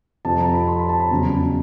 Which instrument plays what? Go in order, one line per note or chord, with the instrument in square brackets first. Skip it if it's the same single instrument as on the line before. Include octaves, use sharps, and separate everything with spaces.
[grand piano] F2 C3 F3 A5
A#5
B5
C6
B5
A5
B5
E2 C#3 F#3 A#5